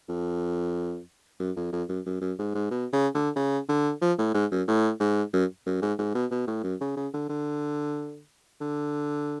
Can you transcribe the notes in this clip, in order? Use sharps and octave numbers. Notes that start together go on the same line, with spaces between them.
F2
F#2
F2
F2
F#2
F#2
F#2
G#2
G#2
B2
C#3
D3
C#3
D3
F3
A2
G#2
F#2
A2
G#2
F#2
F#2
G#2
G#2
B2
B2
A2
F#2
C#3
C#3
D3
D3
D3